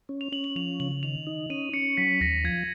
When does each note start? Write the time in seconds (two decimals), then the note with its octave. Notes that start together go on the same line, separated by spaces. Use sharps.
0.09 C#4
0.21 F7
0.32 C#4 F#7
0.44 F#7
0.56 F3 F7
0.80 C#3 F#7
1.03 D#3 F7
1.27 D#4
1.50 C#4 D#7
1.73 C#4 C#7
1.97 F#3 B6
2.20 D#2 A#6
2.44 F3 G#6